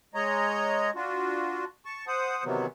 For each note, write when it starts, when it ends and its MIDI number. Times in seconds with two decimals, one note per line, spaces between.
0.14 0.90 56
0.14 0.90 73
0.14 0.90 75
0.14 0.90 82
0.95 1.65 62
0.95 1.65 65
0.95 1.65 66
1.85 2.05 81
1.85 2.05 85
2.07 2.44 72
2.07 2.44 78
2.07 2.44 87
2.44 2.66 48
2.44 2.66 51
2.44 2.66 52
2.44 2.66 54
2.44 2.66 59